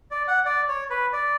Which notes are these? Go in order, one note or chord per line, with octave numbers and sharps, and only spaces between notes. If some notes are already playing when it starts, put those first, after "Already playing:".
D5
F#5
D5
C#5
B4
D5